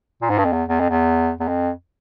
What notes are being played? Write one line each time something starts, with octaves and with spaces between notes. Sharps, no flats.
A#2
G#2
G2
F2
E2
E2
F2
E2
E2
F2